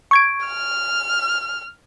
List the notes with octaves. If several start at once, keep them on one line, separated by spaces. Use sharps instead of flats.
C#6 G#6 D7
F6